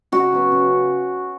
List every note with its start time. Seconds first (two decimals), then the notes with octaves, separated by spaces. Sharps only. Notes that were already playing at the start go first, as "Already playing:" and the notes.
0.12 C#3 F#4
0.32 F#3 B3
0.52 C#3